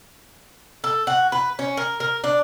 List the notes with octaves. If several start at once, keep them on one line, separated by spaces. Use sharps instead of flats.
A4
F#4
B4
C#4
A#4
A#4
D4